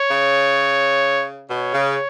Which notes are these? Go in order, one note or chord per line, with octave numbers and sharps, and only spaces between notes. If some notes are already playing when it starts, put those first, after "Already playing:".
Already playing: C#5
C#3
B2 C#5
C#3